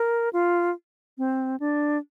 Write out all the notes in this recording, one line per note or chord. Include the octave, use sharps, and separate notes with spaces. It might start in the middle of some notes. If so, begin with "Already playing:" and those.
Already playing: A#4
F4
C4
D4